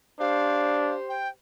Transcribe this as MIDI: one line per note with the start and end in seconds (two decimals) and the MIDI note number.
0.20 0.97 62
0.20 1.30 67
0.20 1.30 72
0.20 0.95 77
1.09 1.28 79